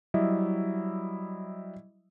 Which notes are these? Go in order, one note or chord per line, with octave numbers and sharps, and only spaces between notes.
F#3 G3 E4 D#5 E5